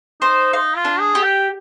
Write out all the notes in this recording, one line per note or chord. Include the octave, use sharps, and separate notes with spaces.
D#4 C5
D#4 F5
F4
D4
G#4
G4
G5